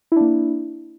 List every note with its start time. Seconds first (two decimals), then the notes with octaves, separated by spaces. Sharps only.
0.12 E4
0.16 D4
0.21 A#3